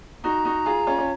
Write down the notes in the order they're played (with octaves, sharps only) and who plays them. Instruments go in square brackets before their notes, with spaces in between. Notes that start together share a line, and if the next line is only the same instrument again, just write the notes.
[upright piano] D#4 F#4 [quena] A#5
[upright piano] D#4 F#4
F4 G#4
C#4 F4
C#4